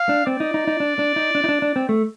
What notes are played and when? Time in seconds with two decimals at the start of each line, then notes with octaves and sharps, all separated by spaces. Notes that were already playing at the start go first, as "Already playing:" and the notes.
Already playing: F5
0.09 D4
0.27 C4 D5
0.40 D#4
0.54 D#4
0.67 D#4
0.80 D4
0.99 D4
1.16 D#4
1.35 D4
1.44 D#4
1.49 D4
1.62 D4
1.76 C4
1.89 A3